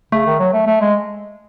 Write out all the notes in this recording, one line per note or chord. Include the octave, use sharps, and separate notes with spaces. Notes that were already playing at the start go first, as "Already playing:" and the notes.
C#3 A3
D#3
F#3
A3
A3
G#3